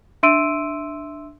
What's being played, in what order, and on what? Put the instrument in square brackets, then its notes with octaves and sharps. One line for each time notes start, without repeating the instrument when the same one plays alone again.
[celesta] D4 E5 C6 E6 D7 D#7